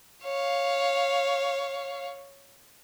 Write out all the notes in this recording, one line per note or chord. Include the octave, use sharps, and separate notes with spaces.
C#5 F5